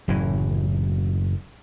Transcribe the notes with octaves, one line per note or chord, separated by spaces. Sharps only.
F#1 F#2 A2 E3